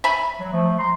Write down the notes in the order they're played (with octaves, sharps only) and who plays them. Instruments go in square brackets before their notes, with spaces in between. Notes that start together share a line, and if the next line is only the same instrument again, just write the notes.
[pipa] E5 G#5 B5
[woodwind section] F#3
F3 A3
A#5 C6